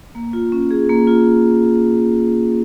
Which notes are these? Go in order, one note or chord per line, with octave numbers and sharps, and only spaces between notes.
A#3
F4
C#4
G#4
A#3
F4